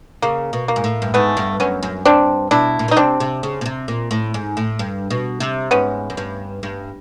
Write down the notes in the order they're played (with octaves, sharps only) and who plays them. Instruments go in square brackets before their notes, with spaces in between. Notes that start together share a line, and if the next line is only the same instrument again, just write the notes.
[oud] C#3 [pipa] A#3
[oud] B2
[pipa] A#3
[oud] G#2
A2
G2
[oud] G#2 [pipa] A3 B3
[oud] G2
[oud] F#2 [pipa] B3 C#4
[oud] F#2
[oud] G2 [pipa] C4 D4
[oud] B2 [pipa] D4 E4
[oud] A#2
B2
[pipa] D#4
[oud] C3 [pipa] C4 D4
[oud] C3
C#3
B2
C3
A#2
A2
G#2
A2
G2
B2
C3
[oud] G#2 [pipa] B3 C#4
[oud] F#2
G2
G2